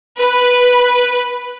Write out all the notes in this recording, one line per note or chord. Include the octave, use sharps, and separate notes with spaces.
B4